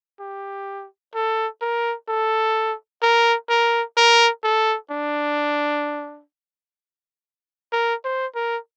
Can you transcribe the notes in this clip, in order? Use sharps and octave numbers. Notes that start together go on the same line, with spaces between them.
G4
A4
A#4
A4
A#4
A#4
A#4
A4
D4
A#4
C5
A#4